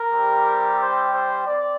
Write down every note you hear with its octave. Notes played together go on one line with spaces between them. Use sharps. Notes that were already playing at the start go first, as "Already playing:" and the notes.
Already playing: A#4
G3 C4 G4
C5
C5
C4 D5